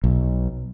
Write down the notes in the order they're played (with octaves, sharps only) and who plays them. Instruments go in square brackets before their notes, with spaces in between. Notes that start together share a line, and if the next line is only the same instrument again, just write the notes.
[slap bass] B1